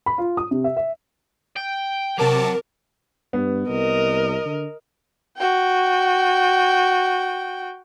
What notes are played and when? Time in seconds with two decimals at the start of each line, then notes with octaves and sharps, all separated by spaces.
0.06 B5
0.18 F4
0.37 D#6
0.51 C3
0.64 E5
0.77 E5
1.56 G5
2.18 C3 F#3 A#4 A5 D6
3.33 G2 B3
3.68 C2 A#4 D#5
4.45 D3
5.37 F#4 G5